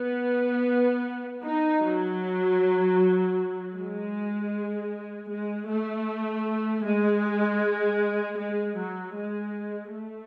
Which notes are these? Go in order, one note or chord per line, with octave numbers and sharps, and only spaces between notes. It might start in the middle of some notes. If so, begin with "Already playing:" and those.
Already playing: B3
D#4
F#3
G#3
G#3
A3
G#3
G#3
F#3
G#3
A3